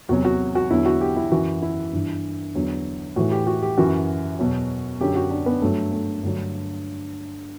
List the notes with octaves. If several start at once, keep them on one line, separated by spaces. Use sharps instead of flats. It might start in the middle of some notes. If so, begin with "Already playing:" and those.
E2 C3 F#3 F#4
F#4
F#4
E2 D3 F#3 E4
F#4
G4
E4
F#2 E3 F#4
E4
G2 E3
E2 D3 F#3
A2 E3 F#4
G4
F#4
G4
F#2 E3 F#4
E2 B2 F#3
F#2 D3 F#3 G4
F#4
D4
B3
G2 F#3 A3
A3
G2 D3 F#3